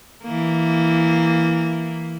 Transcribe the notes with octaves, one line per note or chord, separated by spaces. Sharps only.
E3 A#3